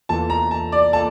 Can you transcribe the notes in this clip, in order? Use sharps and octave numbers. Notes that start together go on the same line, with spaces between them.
E2 E3 A#3 F4 A4 A5
A#5
A5
D5
A#3 F4 A4 A5